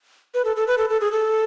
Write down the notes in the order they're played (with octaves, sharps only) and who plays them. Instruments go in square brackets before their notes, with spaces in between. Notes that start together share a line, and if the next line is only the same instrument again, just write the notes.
[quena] B4
A4
A4
B4
A4
A4
G#4
A4